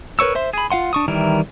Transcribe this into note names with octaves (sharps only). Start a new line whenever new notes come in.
A#4 B4 C#5 C#6 E6
C5 E5 C6
G#4 B5
F4 F5 F#5 C6
D4 C#6 D#6
D#3 E3 G3 E4 A#4